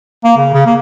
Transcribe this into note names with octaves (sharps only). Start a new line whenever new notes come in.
A#3
C#3
C#3
A#3